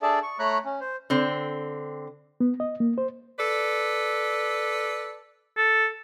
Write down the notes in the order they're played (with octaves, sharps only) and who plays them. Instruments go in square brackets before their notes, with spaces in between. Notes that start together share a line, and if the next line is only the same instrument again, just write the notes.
[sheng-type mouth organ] D4 G#4 A4 D5 E5 A5
C#6
A3 C#5 A#5 B5 F#6
C#4
C5
[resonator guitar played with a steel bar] D3 C4
[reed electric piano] B3
D#5
A#3
C5
[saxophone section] A4 B4 D5
[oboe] A4